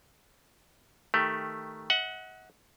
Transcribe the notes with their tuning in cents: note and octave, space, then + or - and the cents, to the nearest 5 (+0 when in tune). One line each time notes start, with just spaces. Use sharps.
D#3 +0 A3 +0 G4 +0
D#5 +45 F#5 +0